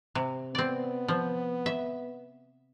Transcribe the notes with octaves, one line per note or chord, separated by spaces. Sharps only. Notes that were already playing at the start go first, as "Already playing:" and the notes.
C3
B3 C4 D5
F3
E5